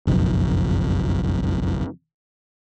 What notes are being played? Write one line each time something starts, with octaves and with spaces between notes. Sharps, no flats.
F#1 B1 F2